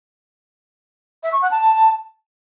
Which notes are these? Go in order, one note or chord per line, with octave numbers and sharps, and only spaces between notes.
E5
C#6
F#5
A5